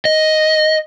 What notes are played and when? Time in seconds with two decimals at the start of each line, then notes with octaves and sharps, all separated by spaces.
0.05 D#5